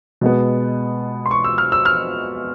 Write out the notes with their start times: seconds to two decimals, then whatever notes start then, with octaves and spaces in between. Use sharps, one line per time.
0.21 B2 G#3 B3
1.26 C6
1.31 C#6
1.44 E6
1.58 F6
1.72 E6
1.85 F6